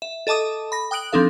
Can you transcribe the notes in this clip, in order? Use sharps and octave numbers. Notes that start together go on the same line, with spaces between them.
E5
A4 D#5 A5 D6 D#6
B5 A#6
G5 D#6 F#6 D7 F#7
F3 C4 D4 D#4 A4 F5